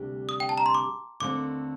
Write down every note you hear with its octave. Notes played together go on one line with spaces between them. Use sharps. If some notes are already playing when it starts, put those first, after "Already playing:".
Already playing: D2 C3 G3 D4 G4
D#6
G5
A5
A#5
C6
D6
D#2 D3 A3 C4 D6